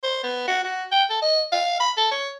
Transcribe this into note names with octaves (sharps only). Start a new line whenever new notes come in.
C5
B3
F#4
F#4
G5
A4
D#5
F5
B5
A4
C#5